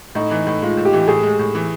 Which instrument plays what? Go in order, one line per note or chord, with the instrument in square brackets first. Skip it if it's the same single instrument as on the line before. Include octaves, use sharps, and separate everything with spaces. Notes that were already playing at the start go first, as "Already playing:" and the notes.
[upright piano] A2 [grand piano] D#4
[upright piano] E3
A2
[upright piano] G#3 [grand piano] F4
[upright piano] A2
[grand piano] G4
[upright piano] E3
[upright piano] A2 [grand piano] G#4
[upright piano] G#3
A2
E3